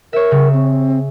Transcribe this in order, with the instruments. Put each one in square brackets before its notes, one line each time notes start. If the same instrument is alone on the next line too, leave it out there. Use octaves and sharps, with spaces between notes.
[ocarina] A#4 [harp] C#5 E5
[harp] C#3
[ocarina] C4